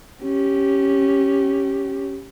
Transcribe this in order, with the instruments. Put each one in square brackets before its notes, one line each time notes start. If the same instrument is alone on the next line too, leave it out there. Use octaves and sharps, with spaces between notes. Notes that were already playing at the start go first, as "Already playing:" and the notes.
[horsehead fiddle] C#4 G4